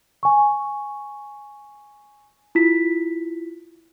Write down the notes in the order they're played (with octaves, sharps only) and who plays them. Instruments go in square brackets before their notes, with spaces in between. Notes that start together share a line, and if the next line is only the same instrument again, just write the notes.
[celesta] G#5 C#6
E4 F4 B6